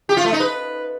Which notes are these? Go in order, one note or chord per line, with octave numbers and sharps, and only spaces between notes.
G4
F4
A3
D#4
B4